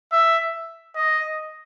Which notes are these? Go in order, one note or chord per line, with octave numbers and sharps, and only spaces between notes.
E5
D#5